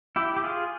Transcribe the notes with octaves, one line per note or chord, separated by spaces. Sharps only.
E4 G4
G4
F4 G#4